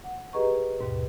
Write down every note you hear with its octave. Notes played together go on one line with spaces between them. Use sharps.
F#5
G4 G#4 B4 D#5 A#5 C#6
D#2 G#2 B2